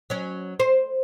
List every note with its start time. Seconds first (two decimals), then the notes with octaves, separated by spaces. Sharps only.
0.10 F#3 C#4
0.60 C5